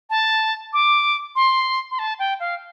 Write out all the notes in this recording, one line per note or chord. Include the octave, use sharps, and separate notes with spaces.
A5
D6
C6
C6
A5
G5
F5